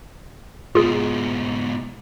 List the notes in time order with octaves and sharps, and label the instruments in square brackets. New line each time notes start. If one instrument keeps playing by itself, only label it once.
[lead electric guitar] G#2 B2 [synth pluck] F4 G#4